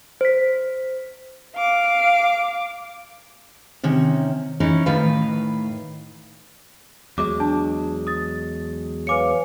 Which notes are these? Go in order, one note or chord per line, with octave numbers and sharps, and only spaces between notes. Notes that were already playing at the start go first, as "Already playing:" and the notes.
C5 B6
F5 D6
C3 D#3 C#4
E3 C#4 D#4
A2 D#3 B4 F5
E2 F#3 G#3 D6
D4 A5
D#6 A6
B4 C#5 F5 G#5 D6 C#7